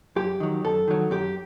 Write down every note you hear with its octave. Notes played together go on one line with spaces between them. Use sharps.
F#2 G4
D#3 F#3
F#2 A4
D#3 F#3
F#2 G4